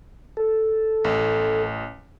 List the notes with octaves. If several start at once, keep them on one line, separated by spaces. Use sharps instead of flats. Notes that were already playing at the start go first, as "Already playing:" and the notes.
A4
A1